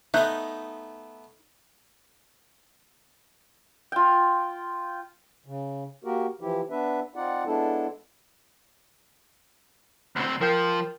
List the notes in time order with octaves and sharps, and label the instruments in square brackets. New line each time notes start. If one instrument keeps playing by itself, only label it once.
[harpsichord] A3 B3 [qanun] D#4 [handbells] E5 F#6 G6
[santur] F4 G5
[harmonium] C#3
A#3 F#4 G4 A#4
E3 F3 E4 G4
B3 D4 B4 E5
C4 D#4 F4 D5 F#5
G#3 B3 D4 E4 A4
[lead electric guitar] D2 C4
[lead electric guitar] F3 [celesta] A#4 G5 G6